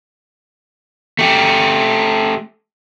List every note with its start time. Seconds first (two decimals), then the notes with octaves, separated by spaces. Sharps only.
1.19 A3 G4